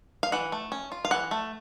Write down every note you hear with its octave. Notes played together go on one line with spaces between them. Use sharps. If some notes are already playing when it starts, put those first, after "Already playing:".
F5
E3 F#5
A3
C#4
F4
F5
E3 F#5
A3